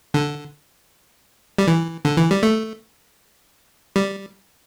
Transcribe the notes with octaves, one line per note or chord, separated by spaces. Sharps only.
D3
G3
E3
D3
E3
G3
A3
G3